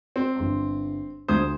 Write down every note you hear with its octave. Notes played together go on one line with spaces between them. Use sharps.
C4
G1 C6
D2 C5 D#6 G#6